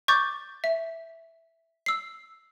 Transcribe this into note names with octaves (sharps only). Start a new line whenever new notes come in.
C#6 D6 G6 A6
E5
E6 C7